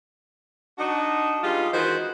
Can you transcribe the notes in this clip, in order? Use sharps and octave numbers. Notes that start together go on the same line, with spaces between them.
D4 D#4 F#4
G2 G3 G#3 D#4 F4
D#3 E3 G#3 F#4 B4 C5